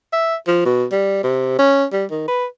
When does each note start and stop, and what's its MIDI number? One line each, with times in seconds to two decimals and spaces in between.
0.13 0.35 76
0.47 0.63 53
0.65 0.85 47
0.92 1.21 55
1.24 1.54 48
1.58 1.85 61
1.92 2.04 55
2.10 2.24 51
2.28 2.45 71